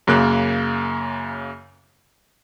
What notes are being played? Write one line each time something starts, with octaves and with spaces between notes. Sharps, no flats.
F#2 C#3 A#3 F#6